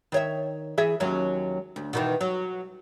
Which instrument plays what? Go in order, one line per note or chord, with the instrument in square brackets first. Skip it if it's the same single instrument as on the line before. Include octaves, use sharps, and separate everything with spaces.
[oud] D#3 C#5 E5
E3 G#4 E5
D#2 F#3 C#4
D2
B2 D#3 E3
F#3